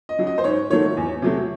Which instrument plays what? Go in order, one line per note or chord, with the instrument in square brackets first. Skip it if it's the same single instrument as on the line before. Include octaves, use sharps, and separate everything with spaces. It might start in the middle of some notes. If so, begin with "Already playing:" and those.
[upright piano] D#5
C#3 F#3
D#5
C5
G#2 C#5
D#3 F#3 A3 C#5
E2
C3 F#3 A3